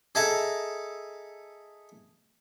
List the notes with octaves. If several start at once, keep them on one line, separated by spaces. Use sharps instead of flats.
G#4 A4 D#5 E5 A5 A#5